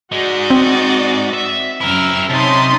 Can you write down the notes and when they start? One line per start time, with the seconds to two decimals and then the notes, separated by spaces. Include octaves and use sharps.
0.12 G#3 D#4 F#4 D5 D#5
0.50 C4
1.34 E5
1.81 F#2 E4 A#4 E6 F6
2.30 C3 C#4 D#4 A5 B5 C6 D#6